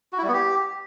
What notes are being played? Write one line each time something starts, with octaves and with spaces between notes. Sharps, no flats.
F#4
E4
G3
B3
G4